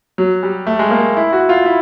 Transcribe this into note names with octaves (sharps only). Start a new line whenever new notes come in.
F#3
G3
A3
G#3
A#3
E4
F#4
F4
E4